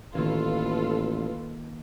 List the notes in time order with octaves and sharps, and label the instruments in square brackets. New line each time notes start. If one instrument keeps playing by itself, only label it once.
[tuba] A1 [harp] D#3 A#3 [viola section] F4 A4 B4